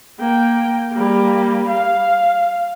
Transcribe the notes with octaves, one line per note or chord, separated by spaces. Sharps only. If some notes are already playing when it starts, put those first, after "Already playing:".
A#3 G5
G3 A#3
F5